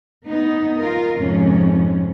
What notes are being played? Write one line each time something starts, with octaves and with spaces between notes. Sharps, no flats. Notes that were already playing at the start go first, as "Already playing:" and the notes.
B3 D#4
F4 A#4
F2 G#2 C3 C#4